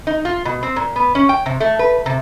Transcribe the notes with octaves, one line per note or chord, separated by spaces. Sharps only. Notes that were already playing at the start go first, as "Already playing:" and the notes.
D#4
F4
B2
C4
A#2
B3
C#4
G5
C3
A3
B4
C3